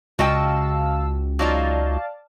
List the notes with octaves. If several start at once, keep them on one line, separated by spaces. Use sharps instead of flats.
C#2 F#4 D#5 F5 G5 A5 E6
F#3 D#4 F4 D5 F5 A5